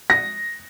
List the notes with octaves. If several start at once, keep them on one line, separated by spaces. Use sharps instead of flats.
A#6